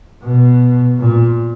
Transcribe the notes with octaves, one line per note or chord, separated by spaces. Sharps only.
B2
A#2